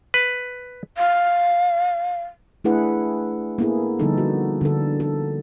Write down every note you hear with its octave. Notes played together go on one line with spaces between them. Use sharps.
B4
F5
A3 D4 E4 G#4 B4 F#5
A#3 B3 E4 G#4 A4
D3 F3 G3 B3 D#4 A4
F#4
D3 D4 A4
A4